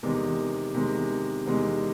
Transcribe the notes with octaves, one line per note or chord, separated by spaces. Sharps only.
E2 C3 D#3 G#3
E2 C3 D#3 G#3
E2 C3 D#3 G#3